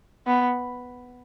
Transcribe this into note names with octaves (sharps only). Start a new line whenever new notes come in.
B3